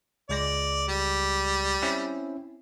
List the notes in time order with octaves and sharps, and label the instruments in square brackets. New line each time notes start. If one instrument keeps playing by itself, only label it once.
[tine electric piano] C#2 G#3 A#6 [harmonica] D5
[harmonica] G3
[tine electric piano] C4 C#4 E4